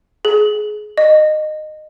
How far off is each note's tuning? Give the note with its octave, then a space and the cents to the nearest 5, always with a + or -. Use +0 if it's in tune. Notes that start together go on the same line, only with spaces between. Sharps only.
G#4 +25
D#5 -20